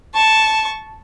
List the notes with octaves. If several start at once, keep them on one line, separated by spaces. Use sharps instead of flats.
A5 C#6